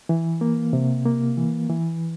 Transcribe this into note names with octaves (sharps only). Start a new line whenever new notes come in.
E3
A#3
C3
A#3
E3
E3